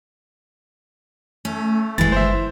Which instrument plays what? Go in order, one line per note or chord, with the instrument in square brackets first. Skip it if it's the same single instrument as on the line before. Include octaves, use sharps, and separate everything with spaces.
[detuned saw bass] A3 [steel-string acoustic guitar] C#4
[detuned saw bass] F#1 [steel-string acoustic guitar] E3 G#3 [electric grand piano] A6
[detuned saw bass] G1 [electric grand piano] C5 E5